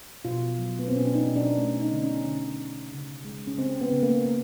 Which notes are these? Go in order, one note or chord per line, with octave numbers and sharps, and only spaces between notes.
B2 F4
F#3
B3
C4
B2 C#4
D4
D#4
B2
D4
A3 C#4
D#4
D3
C#4
D3
D3
C#3
G#3
C#4
C#3 C4
B3
C#3
A#3
A#3